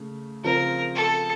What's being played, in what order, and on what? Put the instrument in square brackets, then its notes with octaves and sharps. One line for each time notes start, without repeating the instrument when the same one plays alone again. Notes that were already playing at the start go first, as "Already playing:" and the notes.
Already playing: [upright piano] C#3 A3
[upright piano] C#3 F3 C4 F4 [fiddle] A#4
[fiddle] A4